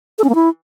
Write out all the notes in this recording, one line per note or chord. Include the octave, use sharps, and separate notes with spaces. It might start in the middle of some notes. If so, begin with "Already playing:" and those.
A4
C#4
A#3
E4